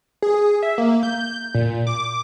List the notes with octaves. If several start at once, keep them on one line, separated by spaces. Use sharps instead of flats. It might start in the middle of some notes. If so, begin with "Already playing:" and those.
G#4
E5
A#3
G6
A#2
D6